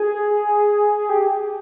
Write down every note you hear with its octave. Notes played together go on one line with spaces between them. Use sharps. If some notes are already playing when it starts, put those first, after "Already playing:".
Already playing: G#4
G4